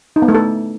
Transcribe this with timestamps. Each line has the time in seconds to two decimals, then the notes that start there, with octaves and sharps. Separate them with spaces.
0.16 D#4
0.22 B3
0.28 A3
0.34 A4